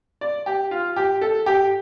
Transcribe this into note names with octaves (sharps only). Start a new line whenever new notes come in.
D5
G4
F4
G4
A4
G4